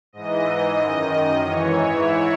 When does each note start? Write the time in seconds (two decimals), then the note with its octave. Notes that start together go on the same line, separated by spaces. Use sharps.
0.13 G#2 E3 D#5
0.79 F#2 D#3
1.44 G#2 E3 C#5
1.77 E4